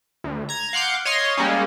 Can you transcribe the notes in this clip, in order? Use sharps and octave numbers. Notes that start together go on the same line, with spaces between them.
D2
A#5 G#6
F5 F#5 C6 D6 G6
C#5 D#5 F5 C6
G3 G#3 A#3 C#4